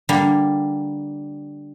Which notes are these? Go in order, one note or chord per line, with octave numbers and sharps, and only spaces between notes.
D3 G3 A#3